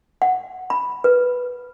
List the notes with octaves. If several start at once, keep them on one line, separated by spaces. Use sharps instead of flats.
F#5
B5
B4